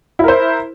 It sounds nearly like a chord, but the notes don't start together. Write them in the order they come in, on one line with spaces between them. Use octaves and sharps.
E4 A#4 C5